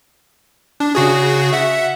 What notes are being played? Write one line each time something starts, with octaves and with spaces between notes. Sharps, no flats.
D4
C#3 F#4 G#4
E5 F#5